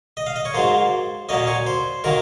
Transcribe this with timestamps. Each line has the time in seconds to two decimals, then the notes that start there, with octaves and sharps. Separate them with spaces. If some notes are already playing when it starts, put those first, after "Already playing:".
0.17 D#5
0.27 F5
0.36 D#5
0.45 C#5
0.54 G#2 F#3 A#3 C5
1.29 A#2 F#3 A#3 C#4 D#5
1.47 C#5
1.66 C5
2.04 D#3 F#3 A#3 A#4